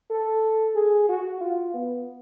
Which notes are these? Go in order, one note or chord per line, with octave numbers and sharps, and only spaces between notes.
A4
G#4
F#4
F4
B3